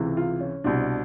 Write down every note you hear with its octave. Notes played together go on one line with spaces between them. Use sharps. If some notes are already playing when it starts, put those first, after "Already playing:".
Already playing: C#2 C3 E3
F4
C#4
C2 B2 D4